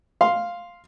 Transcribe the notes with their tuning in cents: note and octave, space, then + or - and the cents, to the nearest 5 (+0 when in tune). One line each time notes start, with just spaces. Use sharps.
F5 +0 C6 +0